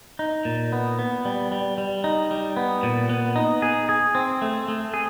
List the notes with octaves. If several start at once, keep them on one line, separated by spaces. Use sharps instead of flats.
D#4
A#2
B3
B3
G3
G3
G3
D#4
G3
B3
A#2
B3
D#4
G#4
G#4
C4
A3
A3
G#4